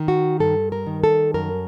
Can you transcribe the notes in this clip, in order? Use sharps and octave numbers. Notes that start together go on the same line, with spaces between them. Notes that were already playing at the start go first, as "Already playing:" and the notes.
Already playing: D#3
F#4
G2 A4
A#4
D#3
A4
F#2 A#4